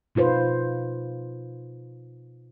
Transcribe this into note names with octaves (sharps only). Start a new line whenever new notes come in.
B2 D#4 F4 B4 C5